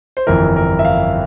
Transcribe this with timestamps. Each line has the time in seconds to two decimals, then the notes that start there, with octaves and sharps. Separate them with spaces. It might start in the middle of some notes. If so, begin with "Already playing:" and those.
0.17 C5
0.27 G1 F2 E3 A#4
0.57 A#4
0.79 E5
0.85 F5